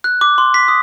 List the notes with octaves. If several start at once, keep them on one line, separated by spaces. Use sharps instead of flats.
F#6
D6
C6
B6
D#6